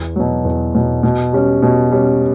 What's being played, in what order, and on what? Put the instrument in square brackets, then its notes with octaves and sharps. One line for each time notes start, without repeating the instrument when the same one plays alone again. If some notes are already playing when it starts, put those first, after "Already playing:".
Already playing: [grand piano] E2
B2 F#3
E2
B2 F#3
B2
G3 C#4
B2
G3 C#4